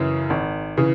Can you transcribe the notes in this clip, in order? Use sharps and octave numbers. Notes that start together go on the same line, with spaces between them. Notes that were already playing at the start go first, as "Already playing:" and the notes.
Already playing: F#2 C#3 E3
G#1
C#3 E3